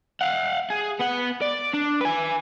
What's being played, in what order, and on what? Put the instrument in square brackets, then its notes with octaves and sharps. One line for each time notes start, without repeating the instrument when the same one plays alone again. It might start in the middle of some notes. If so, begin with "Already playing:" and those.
[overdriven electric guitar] F5 F#5
G#4
B3 F#5
D5
D4
B4 G#5